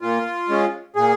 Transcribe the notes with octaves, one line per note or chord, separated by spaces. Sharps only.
A#2 F4
G#3 C#4
A#2 G#4